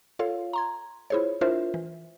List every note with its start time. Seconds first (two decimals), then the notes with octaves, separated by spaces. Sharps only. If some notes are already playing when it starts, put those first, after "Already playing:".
0.19 F4 A4 C#5 F5
0.53 A#5 C6 G#6
1.10 E4 F4 G#4 C5 C#5
1.41 D4 E4 F4 A#4 C5 E5
1.74 E3